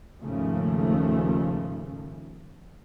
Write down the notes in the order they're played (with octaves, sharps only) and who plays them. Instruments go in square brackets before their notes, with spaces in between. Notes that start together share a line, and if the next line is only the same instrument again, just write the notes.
[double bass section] D#2 G#2 C#3 F3 A3